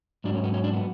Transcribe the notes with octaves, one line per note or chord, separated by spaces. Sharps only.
G#2 F#3 D4
C#4
B3
C#4
D4
B3